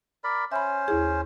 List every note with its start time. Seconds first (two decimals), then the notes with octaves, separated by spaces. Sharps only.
0.24 A#4 D5 B5
0.52 C#4 C5 E5 B5
0.88 D#2 E4 G#4